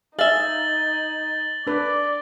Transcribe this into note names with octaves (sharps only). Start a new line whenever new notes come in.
D#4 G#4 E5 F5 A6 F#7 G7
D4 B4 D5